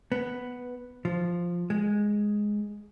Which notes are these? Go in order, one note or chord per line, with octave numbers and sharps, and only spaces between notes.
B3
F3
G#3